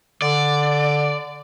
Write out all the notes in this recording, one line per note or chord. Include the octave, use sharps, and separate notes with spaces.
D3 D5